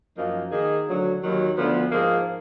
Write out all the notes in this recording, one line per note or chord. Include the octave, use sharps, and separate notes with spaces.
F#2 F3 A#3 D#4
D#3 A#3 D#4 G#4
D2 D3 F#3
D#2 D#3 F#3
D2 D3 F3 B3
G#2 F3 A#3 D#4 G#4